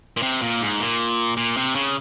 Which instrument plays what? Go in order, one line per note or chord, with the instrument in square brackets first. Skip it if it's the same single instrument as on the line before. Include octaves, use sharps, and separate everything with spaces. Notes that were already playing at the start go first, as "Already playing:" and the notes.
[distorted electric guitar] A#2
C3
A#2
G#2
A#2
A#2
C3
C#3